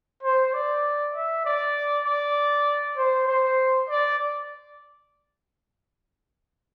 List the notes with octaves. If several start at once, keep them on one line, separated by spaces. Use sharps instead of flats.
C5
D5
E5
D5
D5
C5
C5
D5